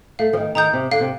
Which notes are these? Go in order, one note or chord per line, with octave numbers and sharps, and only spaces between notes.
A3 F5
F3
D#3
D#3 A#5 D#6 G6
C3
D3 F5
C3